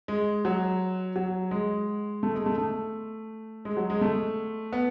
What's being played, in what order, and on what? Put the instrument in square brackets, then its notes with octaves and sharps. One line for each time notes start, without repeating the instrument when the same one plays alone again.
[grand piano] G#3
F#3
F#3
G#3
A3
G#3
A3
A3
G#3
F#3
G#3
A3
B3